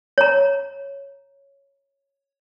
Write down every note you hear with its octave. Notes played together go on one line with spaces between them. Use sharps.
C#5 A#5